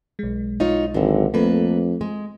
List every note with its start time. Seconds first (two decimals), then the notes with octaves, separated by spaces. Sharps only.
0.19 B1 G#3
0.60 D#4 F4 C#5
0.94 G#1 D3 F#3
1.34 F2 A3 A#3 A4 B4
2.01 G#3